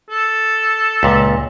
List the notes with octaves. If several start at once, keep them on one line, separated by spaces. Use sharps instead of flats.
A4
C#2 A#2